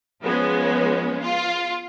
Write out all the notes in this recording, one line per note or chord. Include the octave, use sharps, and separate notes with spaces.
F3 G#3 B3 C#4
F4